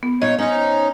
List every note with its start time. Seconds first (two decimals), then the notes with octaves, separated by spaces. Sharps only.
0.03 B3
0.22 A#2 D#4 C#5 D#5
0.39 C#4 D#4 C5 C#5